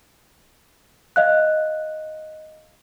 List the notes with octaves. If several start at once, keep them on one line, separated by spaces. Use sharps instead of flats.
D#5 F5 F#6